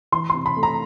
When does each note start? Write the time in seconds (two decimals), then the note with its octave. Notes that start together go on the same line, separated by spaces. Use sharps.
0.12 E3 C6
0.30 C3 C6
0.46 B5
0.57 A3
0.63 A#5